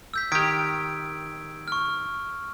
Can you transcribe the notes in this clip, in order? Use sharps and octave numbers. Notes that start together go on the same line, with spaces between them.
E6 G6 B6
D#3 G4 G#6 B6 D7
C#6 F6